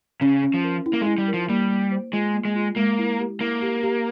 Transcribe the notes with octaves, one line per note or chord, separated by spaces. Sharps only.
C#3 C#4
C#4
F3
A#4
E4
A#3
G#3 E4
G3
A#4
F3
G3 A#3
A#3
C5
G#3 F4
A#3
G#3
F4
G#3 A#3
E4
G4
A#3 E4
G4
G4